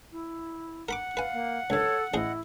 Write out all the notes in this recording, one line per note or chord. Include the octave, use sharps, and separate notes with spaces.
E4
A#4 F#5 B5 D6
B4 F5 G#5
A#3
C#2 F#2 A4 C#5
A1 E4 G#4 C5 D#5